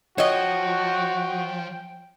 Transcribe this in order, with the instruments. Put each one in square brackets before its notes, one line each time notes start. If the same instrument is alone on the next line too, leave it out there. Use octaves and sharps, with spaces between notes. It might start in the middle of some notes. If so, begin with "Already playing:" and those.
[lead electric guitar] F3 [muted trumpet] F#4 [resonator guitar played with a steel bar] C#5 D#5 [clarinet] G5